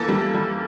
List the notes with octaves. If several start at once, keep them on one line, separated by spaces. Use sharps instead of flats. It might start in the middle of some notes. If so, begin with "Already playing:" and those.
Already playing: E2 E3 A#3 F4 A4
G3
G3